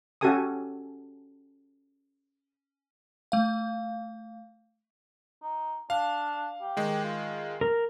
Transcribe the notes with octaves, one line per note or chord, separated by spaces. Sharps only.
C#4 F#4 G4 A4 G#5 D#6
A3 F5
D#4
D4 F5
G4
D#3 G#3
F4
A#4